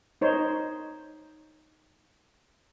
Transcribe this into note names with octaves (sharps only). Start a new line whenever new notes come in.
D#4 C5 C#5